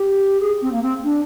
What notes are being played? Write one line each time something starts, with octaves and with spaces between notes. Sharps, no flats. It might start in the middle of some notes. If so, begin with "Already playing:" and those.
Already playing: G4
G#4
C4
A#3
C4
D4